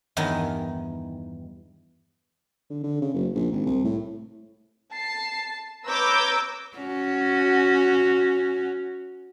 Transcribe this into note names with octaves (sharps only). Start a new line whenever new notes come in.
E2 G2 D#3 E3 D#4
D3
D3
C#3
F#1
A#1
G#1
C2
A2
A5 C7
B4 C#5 A#5 D6 E6 G6
C#4 F#4